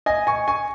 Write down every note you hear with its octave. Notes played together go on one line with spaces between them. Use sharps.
D#5 G#5
G#5 C#6
G#5 C#6